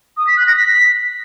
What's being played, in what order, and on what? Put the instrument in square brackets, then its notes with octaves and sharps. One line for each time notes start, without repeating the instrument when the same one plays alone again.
[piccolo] D#6
B6
F#6
A#6
B6